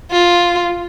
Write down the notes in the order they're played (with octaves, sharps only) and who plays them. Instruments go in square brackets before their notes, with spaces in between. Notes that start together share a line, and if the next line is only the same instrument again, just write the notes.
[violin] F4